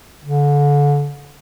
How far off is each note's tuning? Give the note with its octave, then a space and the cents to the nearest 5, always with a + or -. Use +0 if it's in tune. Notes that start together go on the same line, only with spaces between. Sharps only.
D3 -30